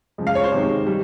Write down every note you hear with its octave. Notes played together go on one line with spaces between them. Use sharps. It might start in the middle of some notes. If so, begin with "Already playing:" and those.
C#3 F3 G#3
F5
C#5
C5
C3 D#3 G#3
G3